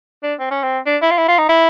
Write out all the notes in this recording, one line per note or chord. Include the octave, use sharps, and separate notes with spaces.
D4
C4
C#4
C4
D4
E4
F4
E4
F4
D#4
E4